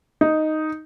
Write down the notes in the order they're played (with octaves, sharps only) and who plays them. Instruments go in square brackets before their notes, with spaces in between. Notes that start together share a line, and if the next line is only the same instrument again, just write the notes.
[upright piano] D#4